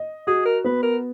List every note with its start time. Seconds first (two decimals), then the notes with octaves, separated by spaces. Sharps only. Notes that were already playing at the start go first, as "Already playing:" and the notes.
Already playing: D#5
0.27 F#4 G#4
0.45 A#4
0.64 B3 B4
0.83 A#4